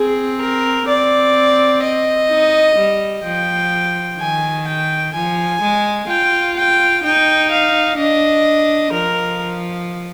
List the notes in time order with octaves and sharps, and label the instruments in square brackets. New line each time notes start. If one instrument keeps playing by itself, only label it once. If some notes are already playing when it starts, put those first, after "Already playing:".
Already playing: [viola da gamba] C4 [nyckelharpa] G#4
[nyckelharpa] A#4
[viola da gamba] C4 [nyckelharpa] D5
[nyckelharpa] D#5
[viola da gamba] D#4
G3
[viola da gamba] F3 [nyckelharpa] G5
[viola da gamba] D#3 [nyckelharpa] G#5
[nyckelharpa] G5
[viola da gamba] F3 [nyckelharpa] G#5
[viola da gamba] G#3
[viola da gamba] F4 [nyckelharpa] G5
[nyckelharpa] G5
[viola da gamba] D#4 [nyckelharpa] G5
[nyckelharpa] F5
[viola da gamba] D4 [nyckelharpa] D#5
[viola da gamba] F3 [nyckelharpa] A#4